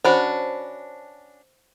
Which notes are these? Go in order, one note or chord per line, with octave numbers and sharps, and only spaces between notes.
C#4 D4 F#4 C5 B5